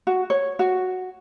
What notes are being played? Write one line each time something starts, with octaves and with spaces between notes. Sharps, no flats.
F#4
C#5
F#4